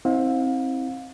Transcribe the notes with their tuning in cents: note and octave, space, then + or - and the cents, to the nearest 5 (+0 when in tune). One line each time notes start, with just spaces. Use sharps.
C4 +15 E4 -40 F5 +35